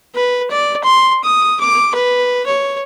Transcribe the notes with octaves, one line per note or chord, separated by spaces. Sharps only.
B4
D5
C6
D#6
D6
B4
C#5